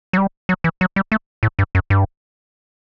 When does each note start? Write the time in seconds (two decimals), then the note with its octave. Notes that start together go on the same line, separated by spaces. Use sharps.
0.13 F#3
0.17 G3
0.49 F#3
0.64 E3
0.81 F#3
0.96 G3
1.12 A3
1.43 A2
1.59 G2
1.75 F#2
1.90 G2